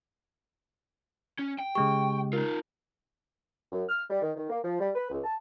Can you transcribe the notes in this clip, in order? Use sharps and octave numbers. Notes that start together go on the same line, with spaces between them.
C#4
G5
C#3 G#3 G4 C#6
D#4 F4 A#4
F#2
F6
G3
D#3
D#3
A#3
F3
G3
B4
C#2
A5